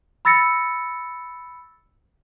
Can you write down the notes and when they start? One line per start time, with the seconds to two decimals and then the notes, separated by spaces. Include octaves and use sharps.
0.25 B5 E6 A6 A#6 C#7